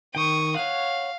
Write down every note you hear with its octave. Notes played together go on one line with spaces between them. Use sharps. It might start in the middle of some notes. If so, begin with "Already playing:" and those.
D#3 G5 C#6 D#6
C#5 F5 F#5